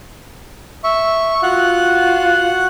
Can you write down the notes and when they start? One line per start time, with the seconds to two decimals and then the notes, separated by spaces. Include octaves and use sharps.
0.84 E5 C#6
1.43 F4 F#4 F#5 F#6